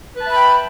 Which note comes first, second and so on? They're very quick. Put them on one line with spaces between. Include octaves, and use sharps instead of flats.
B4 A5 E5 B5 G5